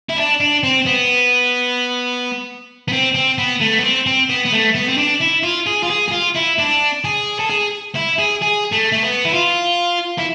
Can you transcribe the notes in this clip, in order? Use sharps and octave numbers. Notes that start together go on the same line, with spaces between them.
E4
D4
D4
C4
B3
B3
C4
C4
B3
A3
B3
C4
C4
B3
B3
A3
B3
C4
D4
E4
F4
G#4
F4
G#4
G#4
F4
E4
D4
G#4
A4
G#4
E4
G#4
G#4
A3
A3
B3
E4
F4
E4